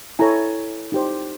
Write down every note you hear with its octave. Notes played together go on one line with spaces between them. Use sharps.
E4 A4 C#5 G#5 A#5
D#4 G4 C5